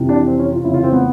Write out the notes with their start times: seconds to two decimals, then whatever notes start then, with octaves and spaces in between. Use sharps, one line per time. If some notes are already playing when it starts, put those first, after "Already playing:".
Already playing: F2 C3 E3
0.09 D4
0.27 C4
0.39 C#4
0.53 F4
0.64 F2 C#3 E3 E4
0.74 F4
0.83 C4
0.92 B3